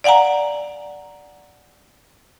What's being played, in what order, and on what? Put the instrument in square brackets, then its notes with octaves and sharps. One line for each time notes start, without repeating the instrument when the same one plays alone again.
[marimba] D5 F5 F#5 G#5 A#5